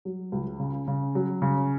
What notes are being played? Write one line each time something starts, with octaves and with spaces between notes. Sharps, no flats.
F#3
C#2
C#3
C#3
F#3
C#3